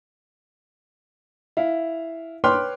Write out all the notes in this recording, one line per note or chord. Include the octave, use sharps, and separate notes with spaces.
E4 F5
B4 C#5 G5 C6 D6 F6